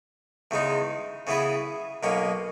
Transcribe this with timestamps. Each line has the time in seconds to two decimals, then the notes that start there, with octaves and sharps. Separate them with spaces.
0.51 E2 C#3 G#3 D#4
1.27 C#3 E3 B3 E4 G#4
2.03 B1 B2 A#3 C#4